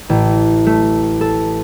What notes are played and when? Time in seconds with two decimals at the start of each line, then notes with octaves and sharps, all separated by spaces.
0.09 A1
0.66 A3
1.21 A4